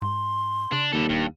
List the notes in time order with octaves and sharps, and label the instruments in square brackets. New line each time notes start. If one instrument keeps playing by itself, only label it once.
[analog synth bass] G#2 [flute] C6
[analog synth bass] C#3 [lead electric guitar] D4
[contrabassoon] D#2 [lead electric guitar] G3 A4
[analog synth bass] E1 [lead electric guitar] G2